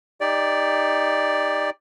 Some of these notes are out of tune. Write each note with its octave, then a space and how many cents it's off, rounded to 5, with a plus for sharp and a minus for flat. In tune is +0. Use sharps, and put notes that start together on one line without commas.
D#4 +0 G4 +25 D5 +0